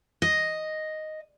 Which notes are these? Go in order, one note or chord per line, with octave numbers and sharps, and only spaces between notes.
D#5